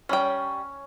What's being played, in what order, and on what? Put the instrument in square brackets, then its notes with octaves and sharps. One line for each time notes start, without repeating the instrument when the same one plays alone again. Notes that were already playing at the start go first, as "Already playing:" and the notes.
[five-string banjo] G3 G5 [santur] C#4